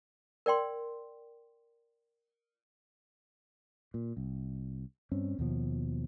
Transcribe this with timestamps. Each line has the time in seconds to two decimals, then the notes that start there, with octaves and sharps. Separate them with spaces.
0.46 A#4 D5 G5 C6
3.94 A#2
4.17 C2
5.12 G2 C4 C#4
5.39 D#2 B2 F3